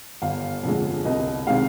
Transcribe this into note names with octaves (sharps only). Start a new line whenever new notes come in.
G1 F5
F2 D3 G#3
C2 D#5
C3 D#3 G#3 F5